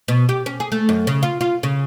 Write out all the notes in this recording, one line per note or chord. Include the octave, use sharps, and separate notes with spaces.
B2
G4
C#4
G#4
A3
F#2
C#3
F4
F4
C#3